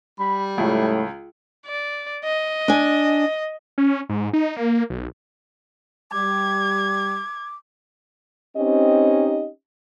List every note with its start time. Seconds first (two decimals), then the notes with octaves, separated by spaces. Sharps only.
0.19 G3 B5
0.58 C#2 A2 A3
1.66 D5
2.24 D#5
2.68 D4 G#5
3.78 C#4
4.09 G#2
4.33 D#4
4.56 A#3
4.90 B1
6.12 G3 D6 G#6
8.57 C4 C#4 D#4 G4 D#5